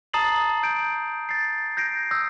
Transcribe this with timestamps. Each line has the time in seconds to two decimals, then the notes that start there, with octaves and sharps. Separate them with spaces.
0.14 A5 A#5 D#6 A6 C7 F#7
0.63 G6 D7
1.29 A6 C7
1.77 G6 A#6 C7 D7
2.11 D#6 E6 G6 A#6